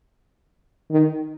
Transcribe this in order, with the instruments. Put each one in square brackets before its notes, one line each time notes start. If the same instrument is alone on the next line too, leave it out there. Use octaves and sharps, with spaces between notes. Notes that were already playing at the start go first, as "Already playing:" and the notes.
[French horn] D#3